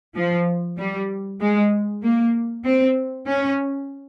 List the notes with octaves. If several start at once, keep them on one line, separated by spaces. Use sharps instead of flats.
F3
G3
G#3
A#3
C4
C#4